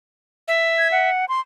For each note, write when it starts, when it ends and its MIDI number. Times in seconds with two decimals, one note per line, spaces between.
0.48 1.10 76
0.78 0.88 92
0.92 1.25 78
1.29 1.40 84